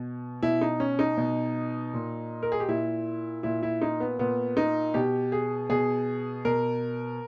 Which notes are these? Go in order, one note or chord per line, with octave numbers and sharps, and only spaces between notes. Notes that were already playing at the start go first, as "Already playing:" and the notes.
Already playing: B2
B2 E4
D#4
C#4
D#4
B2
A#2
A#4
G#4
G4
A#2 E4
A#2 E4
E4
D#4
B3
A#2 B3
D#4
B2 G4
G#4
B2 G#4
B2 A#4